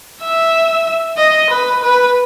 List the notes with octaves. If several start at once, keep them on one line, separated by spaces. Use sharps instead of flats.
E5
D#5
B4
B4